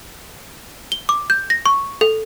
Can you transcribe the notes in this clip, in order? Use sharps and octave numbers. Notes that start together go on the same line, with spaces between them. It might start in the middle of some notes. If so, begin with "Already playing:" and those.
G7
D6
G6
A#6
C#6
A4